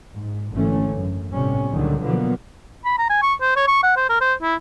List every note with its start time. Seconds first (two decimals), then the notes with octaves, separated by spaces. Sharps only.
0.15 G#2
0.51 G#1 D3 E3 A3 C#4
0.92 F#2
1.32 G1 A2 C3 G3 C#4
1.71 C#2 A#2 D3 D#3 F#3 G3
2.01 B2 D3 F3 F#3 A#3 B3
2.85 B5
2.98 A#5
3.09 G#5
3.22 C#6
3.41 C5
3.56 C#5
3.67 C#6
3.83 F#5
3.97 C5
4.09 A#4
4.21 C5
4.42 E4